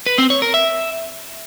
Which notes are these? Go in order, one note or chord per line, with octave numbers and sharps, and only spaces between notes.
B4
C4
C#5
A#4
E5